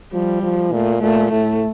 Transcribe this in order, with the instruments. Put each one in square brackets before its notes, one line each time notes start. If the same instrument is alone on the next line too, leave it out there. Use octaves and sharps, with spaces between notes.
[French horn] F3 [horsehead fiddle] G3
[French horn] F3
[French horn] A#2 [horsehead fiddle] A3
[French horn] A#2 [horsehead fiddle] A3
[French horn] A2 [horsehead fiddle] A3